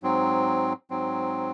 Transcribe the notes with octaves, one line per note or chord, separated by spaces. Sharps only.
G#2 F#3 C4
G#2 F#3 C4